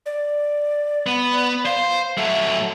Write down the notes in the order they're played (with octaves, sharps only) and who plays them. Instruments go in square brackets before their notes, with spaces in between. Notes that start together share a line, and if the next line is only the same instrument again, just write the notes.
[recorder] D5
[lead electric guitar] B3
[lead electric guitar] C5 [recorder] F5
[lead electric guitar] F#3 A3 [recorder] E5